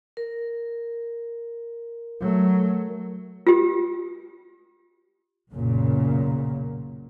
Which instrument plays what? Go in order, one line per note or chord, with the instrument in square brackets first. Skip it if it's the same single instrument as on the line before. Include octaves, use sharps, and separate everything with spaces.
[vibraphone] A#4
[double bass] F#3 A3
[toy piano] F4 G4
[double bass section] B1 F#2 A#2 C#3 A#3